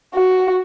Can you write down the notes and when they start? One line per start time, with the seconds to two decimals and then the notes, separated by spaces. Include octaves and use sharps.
0.14 F#4